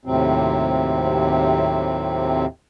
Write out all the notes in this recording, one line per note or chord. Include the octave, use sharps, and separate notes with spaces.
D#2 A2 C3 F#3 C4